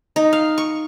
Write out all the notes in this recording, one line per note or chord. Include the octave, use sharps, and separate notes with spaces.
D#4
F5
C#6